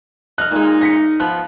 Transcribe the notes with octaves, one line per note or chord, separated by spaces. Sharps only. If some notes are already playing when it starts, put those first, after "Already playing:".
D#4 F6 F#6
A#2 G#3 D#4
A#6 B6 C#7
F3 B3 F#6